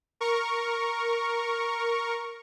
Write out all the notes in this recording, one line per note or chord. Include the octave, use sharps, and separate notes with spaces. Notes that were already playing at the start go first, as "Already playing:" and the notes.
A#4 C#6